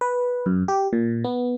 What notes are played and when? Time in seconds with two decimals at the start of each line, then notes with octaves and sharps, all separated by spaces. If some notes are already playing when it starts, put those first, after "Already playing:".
0.01 B4
0.46 F#2
0.68 G4
0.93 A#2
1.24 B3